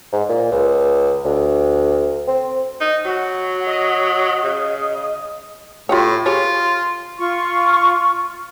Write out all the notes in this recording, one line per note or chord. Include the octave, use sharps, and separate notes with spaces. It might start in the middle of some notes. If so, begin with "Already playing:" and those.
G#2
A#2
C#2
D2
C4
D#4
F#3 F#4
D#5
C#3
A2 F4 G4 C#5
F4 G4 G#4 C#5
F4 C#6